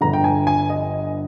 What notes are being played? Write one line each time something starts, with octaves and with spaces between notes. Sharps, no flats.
G1 G2 D3 A#5
G5
G#5
G#5
D#5